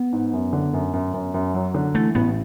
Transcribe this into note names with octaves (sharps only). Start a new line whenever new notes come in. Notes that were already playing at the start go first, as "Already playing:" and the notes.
Already playing: B3
G#2
F#2
D3
F#2
F#2
F#2
F#2
F#3
D3
E3 A3
A1 B3